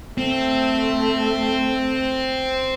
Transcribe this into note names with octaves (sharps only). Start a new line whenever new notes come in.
A3 C4